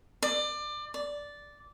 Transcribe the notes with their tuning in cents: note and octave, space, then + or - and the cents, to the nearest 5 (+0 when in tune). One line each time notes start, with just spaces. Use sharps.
D5 +25
D5 -5